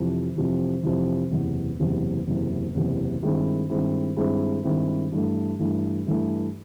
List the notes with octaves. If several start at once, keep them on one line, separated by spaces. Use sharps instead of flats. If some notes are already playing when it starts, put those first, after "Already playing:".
Already playing: F2 C3 E3
F2 C3 E3
F2 C3 E3
F#1 E2 C3 E3
F#1 E2 C3 E3
F#1 E2 C3 E3
F#1 E2 C3 E3
G2 D#3 G#3 C4 E4
G2 D#3 G#3 C4 E4
G2 D#3 G#3 C4 E4
G2 D#3 G#3 C4 E4
G2 E3 A3
G2 E3 A3
G2 E3 A3